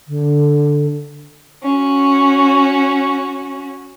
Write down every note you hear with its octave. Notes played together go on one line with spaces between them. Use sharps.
D3
C#4 F#4